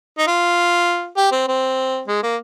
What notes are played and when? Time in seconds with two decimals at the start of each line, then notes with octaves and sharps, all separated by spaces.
0.18 D#4
0.27 F4
1.17 G4
1.32 C4
1.48 C4
2.07 G#3
2.23 A#3